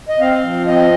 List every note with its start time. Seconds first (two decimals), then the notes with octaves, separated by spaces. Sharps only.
0.09 D#5
0.20 C4 F5
0.43 F3
0.66 C4 D#5